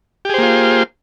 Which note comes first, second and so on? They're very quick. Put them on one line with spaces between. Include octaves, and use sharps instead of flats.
G4 G#4 C5 A#3 F4